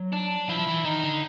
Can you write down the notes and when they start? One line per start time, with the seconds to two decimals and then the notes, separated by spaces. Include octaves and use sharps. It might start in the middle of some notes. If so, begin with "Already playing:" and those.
Already playing: F#3
0.13 D4
0.49 F3 E4
0.59 F3
0.67 E3
0.85 D#3 D#4
1.03 D3